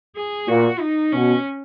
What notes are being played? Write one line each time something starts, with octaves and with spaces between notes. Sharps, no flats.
G#4
A#2 F#4
D#4
B2 C#4